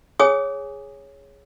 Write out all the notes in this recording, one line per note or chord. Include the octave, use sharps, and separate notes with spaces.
G#4 C#5 G#5 D#6